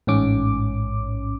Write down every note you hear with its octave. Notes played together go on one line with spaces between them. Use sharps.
A1 G#2 C#4 D6